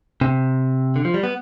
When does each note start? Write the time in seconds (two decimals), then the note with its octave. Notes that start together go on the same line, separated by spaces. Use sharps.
0.21 C3
0.96 D3
1.05 F3
1.14 G3
1.23 B3